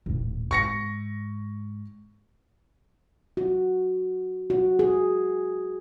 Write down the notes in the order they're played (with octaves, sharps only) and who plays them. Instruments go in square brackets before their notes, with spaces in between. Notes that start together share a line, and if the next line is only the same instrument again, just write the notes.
[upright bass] D#1 A2
[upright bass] G#2 [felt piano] C#6 A#6 C#7
[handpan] F#4
F#4
G#4